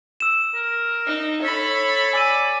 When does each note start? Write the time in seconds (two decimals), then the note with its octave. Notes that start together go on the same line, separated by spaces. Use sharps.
0.20 E6 E7
0.55 A#4
1.06 D#4
1.42 A4 C#5 B5
2.13 D5 G#5 E6 D#7